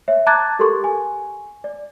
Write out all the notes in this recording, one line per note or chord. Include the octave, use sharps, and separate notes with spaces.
C#5 E5
A5 A#5 D6 F#6 G#6 A6
G4 A4 A#4 C6 C#6
G#5
D5